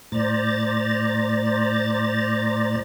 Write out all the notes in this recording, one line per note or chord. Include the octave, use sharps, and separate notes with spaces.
A2 C5 D5 A#5 A6